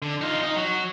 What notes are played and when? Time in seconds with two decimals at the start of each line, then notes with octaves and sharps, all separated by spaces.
0.02 D3
0.21 D#4 F4
0.43 D#4
0.56 F#3